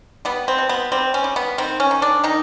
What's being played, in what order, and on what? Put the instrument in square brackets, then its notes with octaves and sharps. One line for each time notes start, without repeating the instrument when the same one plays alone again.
[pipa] G3 B3
C4
B2
B3
G3 C4
C#4
G3
B3
D#3 C4
C#4
D#3
D4
D#3 D#4